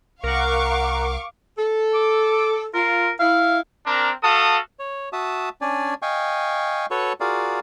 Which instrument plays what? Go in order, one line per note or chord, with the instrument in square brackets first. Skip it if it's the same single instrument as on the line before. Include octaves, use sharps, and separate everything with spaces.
[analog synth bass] C2 [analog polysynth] A#4 F#5 [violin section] F5 C#6 D6
[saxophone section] A4
[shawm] D6
[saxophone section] F4 [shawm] A#4
[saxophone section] E4 [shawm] F5
[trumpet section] C4 D4 A#4
F#4 A4 F5 A5 D#6
[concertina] C#5
F#4 E5 A5 D#6
C#4 D4 D5 G#5
D#5 F5 G5 G#5 C#6
F#4 A4 B4 C#5 C#6
F4 F#4 G#4 A#4 D5 F5